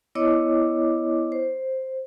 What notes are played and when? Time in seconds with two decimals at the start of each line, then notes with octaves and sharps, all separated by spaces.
0.15 B3 E4 C#5 D#5 D6
1.32 C5